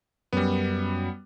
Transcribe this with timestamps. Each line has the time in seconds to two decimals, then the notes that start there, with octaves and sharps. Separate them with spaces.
0.33 F#2 G3 B3